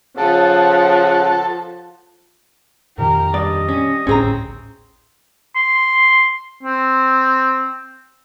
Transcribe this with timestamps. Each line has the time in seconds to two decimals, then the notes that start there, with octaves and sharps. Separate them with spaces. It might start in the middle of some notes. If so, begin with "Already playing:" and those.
0.18 C#3 F3 A4 F#5
2.98 F2 A#2 D#3 G4 A#4
3.34 G2 G3 D5 D#5
3.68 C#4
4.07 G#1 D2 A2 C4 C#4 G#4 A#5
5.56 C6
6.63 C4